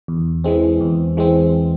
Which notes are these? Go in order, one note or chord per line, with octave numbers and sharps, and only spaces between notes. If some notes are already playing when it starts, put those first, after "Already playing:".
E2
E3 G#3 C4
E2
E3 G#3 C4